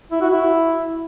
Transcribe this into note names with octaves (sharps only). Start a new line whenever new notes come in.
E4
F#4
E4